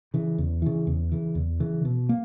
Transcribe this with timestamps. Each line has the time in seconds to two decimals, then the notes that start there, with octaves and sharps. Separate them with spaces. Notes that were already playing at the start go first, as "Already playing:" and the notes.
0.14 C#3 E3
0.38 E2
0.62 C#3 E3
0.87 E2
1.12 C#3 E3
1.35 E2
1.60 C#3 E3
1.85 B2
2.09 A#3